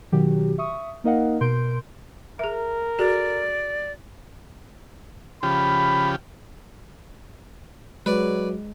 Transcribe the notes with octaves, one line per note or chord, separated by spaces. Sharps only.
B2 D#3 F#3 F#4 G4
E5 C#6 D#6
A#3 D#4 A#4 D#5 F5 F#5
B2 A#4 C6 G6 D7
G#4 A#4 E5
F#4 G#4 A4 D5
C#3 F3 G4 B5
F#3 G#3 B4 D5